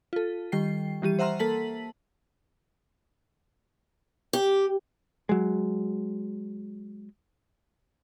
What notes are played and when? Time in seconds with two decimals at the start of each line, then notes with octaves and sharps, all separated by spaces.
0.13 F4 A4
0.52 D#3 G3 G5 C7
1.02 E3 G3 G4 D#7
1.19 C5 E5 F#5 A#5 C6 F6
1.39 A#3 A4 A5 B6 F#7
4.33 G4
5.29 F#3 G#3